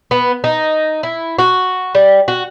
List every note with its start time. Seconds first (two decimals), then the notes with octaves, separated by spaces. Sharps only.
0.11 B3
0.44 D#4
1.03 E4
1.39 F#4
1.95 G3
2.28 F#4